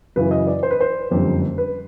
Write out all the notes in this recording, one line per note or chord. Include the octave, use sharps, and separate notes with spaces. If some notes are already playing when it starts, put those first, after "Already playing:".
F#2 C#3 E3 B4
D#5
D5
C5
B4
C5
F#1 F2 D3 G3
B4